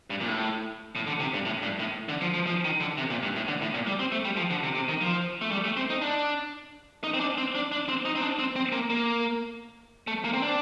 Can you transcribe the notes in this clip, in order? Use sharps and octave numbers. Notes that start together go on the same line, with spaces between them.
G2
A#2
A2
A2
D3
C3
G2
A2
G2
A2
D3
F3
F3
F3
D#3
D3
C3
A#2
G2
A2
D3
A2
A#2
G3
C4
A3
G3
F3
D3
C3
C3
D#3
F3
A3
G3
A3
C4
D#4
D4
D#4
C4
D4
C4
D4
D4
C4
D#4
C4
D4
C4
C4
A#3
A#3
A3
A#3
C4
D4